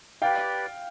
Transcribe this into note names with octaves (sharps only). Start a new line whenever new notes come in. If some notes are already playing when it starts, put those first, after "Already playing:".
G4 B4 D5 F5 G5